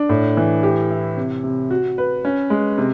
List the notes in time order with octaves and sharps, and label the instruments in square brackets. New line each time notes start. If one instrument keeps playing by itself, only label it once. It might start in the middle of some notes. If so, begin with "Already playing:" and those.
Already playing: [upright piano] D4
A2
E3
G4
E4
C3
C3
F#4
B4
C#4
G#3
C3